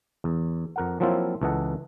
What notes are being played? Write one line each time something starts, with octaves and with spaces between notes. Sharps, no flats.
E2
F2 A#4 F#5
F3 F#3 A#3 C4 E4 F4
C#2 E3 A4 D#5 F#5